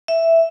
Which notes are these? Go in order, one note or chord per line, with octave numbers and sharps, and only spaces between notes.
E5